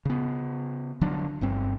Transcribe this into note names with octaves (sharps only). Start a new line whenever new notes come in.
C#3 B3
D3 F3 F#3 D4
G1 G2 C4